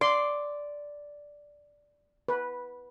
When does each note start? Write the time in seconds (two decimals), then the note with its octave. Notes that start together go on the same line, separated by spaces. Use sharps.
0.01 D5 C6
2.28 B4